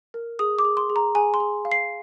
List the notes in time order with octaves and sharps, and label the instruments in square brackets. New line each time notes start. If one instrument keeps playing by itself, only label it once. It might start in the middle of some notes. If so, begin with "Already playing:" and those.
[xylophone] A#4
G#4 D#6
D6
G#4
C6
G#4
A#5
G#4 G#5
C6
G#4
F5
C7